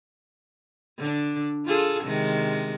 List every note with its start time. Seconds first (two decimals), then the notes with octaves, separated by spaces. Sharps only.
0.99 D3 D4
1.66 F4 G#4 A4
2.04 C3 D#3 G#3